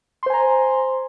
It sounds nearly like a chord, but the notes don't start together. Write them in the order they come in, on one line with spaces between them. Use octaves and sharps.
C6 C5 G#5 A#5